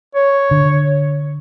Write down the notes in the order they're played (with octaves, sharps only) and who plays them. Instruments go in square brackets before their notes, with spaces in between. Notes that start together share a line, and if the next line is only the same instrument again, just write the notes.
[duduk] C#5
[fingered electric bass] D3